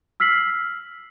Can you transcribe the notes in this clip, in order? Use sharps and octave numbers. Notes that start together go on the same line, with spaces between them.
E6 F6 B6 C7 F#7